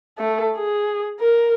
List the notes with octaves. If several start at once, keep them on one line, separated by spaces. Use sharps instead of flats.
A3 A4
G#4
A#4